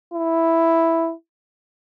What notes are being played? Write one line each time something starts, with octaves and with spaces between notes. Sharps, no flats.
E4